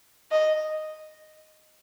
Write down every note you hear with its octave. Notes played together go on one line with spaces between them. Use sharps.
D#5